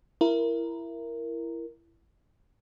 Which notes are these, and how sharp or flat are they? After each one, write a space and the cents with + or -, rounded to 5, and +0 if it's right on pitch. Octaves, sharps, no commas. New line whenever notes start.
E4 +20 A#4 +0